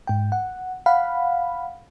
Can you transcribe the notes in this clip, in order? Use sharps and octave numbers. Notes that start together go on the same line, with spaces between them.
G#2 G5
F#5
F5 F#5 B5